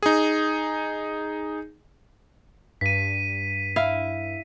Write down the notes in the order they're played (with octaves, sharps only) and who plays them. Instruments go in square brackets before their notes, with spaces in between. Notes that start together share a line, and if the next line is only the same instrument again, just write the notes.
[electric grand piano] D#4 G#4
[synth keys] G2 [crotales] B6 D#7
[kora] E4 F5